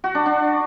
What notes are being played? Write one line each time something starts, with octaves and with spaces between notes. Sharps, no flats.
F#4
D4
D4